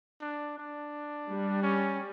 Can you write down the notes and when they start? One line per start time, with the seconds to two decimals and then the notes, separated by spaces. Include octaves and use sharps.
0.22 D4
0.58 D4
1.28 G3
1.63 C#4